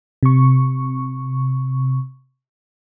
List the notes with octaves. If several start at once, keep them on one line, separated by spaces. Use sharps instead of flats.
C3 C#6